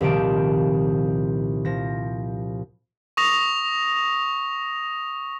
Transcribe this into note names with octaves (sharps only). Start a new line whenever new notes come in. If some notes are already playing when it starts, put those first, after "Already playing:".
C2 A#2 D#3 F3 A5 D7
F3 A#6
C#6 D#6 A#6 F7